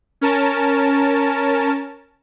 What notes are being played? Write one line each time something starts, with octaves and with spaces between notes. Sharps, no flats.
C#4 A#4 A5